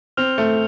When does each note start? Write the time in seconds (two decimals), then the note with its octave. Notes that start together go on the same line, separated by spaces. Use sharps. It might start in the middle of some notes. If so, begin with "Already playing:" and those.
0.17 C4 F6 F7
0.38 A3